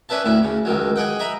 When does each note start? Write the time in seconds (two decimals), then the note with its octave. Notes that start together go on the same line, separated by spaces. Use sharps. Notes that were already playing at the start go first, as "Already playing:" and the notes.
0.09 C#4 D4 B4 E5 A5
0.25 D2 A2 E4
0.43 C#3
0.65 C#2 D#3 F#3
0.96 G#4 D#5 F#5 G5
1.19 D#5 E5 A#5 B5